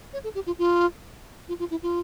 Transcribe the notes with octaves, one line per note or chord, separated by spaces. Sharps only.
C#5
A4
G4
F4
F4
F4
F4
E4
F4